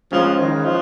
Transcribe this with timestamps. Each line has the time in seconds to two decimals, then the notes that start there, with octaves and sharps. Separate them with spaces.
0.12 C#2 C#3 F3 G#3 C#4 G#4
0.39 D#3
0.64 F3